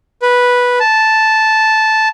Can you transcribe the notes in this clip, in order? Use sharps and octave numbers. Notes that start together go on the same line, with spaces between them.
B4
A5